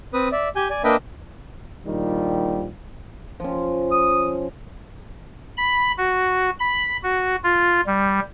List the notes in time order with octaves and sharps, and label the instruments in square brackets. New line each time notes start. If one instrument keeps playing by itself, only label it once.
[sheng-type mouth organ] C4 B4 D#6
D5 E5
G4 G#5 G6
D5 G#5
A#3 D4 B4 D#5 E5 G5
[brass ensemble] A#1 D#3 F3 G3
[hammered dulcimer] F3 C#4
[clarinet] D#6
[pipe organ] B5
F#4
B5
F#4
F4
G3